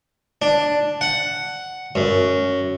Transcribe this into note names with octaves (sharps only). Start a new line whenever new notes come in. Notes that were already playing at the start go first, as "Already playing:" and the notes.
D4
F#5
F#2